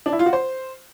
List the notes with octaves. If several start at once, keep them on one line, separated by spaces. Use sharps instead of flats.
D4
E4
F4
F#4
C5